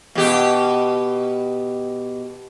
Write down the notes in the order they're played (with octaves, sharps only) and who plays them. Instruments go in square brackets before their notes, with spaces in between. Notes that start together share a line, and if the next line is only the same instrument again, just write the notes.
[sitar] B2 G4